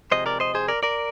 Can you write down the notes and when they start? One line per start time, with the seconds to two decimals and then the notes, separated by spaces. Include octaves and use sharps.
0.11 C3 F3 G#3 C5 D#5
0.26 A#4 D5
0.40 C5 D#5
0.55 G#4 C5
0.68 A#4 D5
0.83 A#4 D5